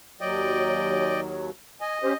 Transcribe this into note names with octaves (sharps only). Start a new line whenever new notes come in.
D#2 F#3 D5 D#5 G5
D#5 G#5
C#4 G4 C5